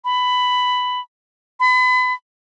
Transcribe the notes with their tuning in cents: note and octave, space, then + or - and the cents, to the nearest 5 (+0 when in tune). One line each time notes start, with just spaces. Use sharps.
B5 +10
B5 +35